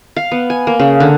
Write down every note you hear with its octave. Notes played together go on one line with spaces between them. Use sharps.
F5
B3
G#5
A#3
C#3
D3